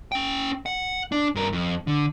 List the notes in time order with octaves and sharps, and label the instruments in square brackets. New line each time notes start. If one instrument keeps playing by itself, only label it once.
[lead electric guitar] C#4 G5
F#5
D4
G2 A#4
F2
D3